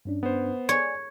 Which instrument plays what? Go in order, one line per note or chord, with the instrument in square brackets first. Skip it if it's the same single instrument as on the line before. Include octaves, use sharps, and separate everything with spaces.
[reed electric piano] G2 C#4 D4
[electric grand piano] B3 C5
[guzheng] C#5 [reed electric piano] D5 G#5